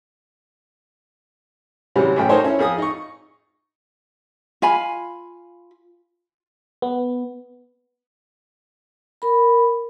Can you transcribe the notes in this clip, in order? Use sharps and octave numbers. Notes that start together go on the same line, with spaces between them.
C3 E3 F#3 G3 C#4
A1 F#2 A3 C#4 G5
D#4 A4 A#4 C5 C#5
C#4 E4
F2 G#4 D#6
D#4 C#6
F4 F5 G#5 B5
B3
A#4 B5